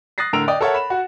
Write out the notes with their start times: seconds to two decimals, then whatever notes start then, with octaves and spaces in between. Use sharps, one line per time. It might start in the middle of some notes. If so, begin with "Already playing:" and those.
0.18 D#6 F#6 A6 A#6 C7
0.33 A2 D3 A#4 E6 D7 F7
0.48 D5 D#5 G5 D#6
0.61 A4 A#4 C#5 E5 F#5 A5
0.74 B5 E7
0.90 F#4 F#5